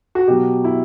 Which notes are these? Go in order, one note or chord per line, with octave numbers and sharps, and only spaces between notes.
F#4
B2 F#3 G4
E4